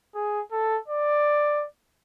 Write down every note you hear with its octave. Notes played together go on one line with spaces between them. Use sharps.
G#4
A4
D5